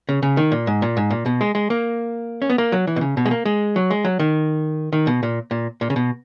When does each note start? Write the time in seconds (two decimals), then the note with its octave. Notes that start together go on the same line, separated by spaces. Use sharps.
0.09 C#3
0.23 C#3
0.37 D#3
0.52 A#2
0.67 G#2
0.82 A#2
0.97 G#2
1.11 A#2
1.26 B2
1.41 G#3
1.55 G#3
1.70 A#3
2.42 C#4
2.50 B3
2.58 A#3
2.72 F#3
2.87 E3
2.96 B2
3.01 C#3
3.17 B2
3.26 G#3
3.31 A#3
3.45 G#3
3.76 F#3
3.91 G#3
4.05 F#3
4.20 D#3
4.93 D#3
5.07 B2
5.23 A#2
5.51 A#2
5.81 A#2
5.90 C#3
5.96 B2